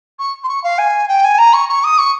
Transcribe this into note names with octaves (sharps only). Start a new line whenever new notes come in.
C#6
C6
C#6
F5
G#5
G5
G#5
A#5
C#6
C#6
D#6
C#6